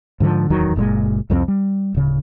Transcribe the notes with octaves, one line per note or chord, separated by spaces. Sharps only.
G#2 D3 D#3 F3
D1 E2 D#3 F#3
F#1 A#2 C#3 G#3
C2 F2 G3 C4
G3
D1 C#3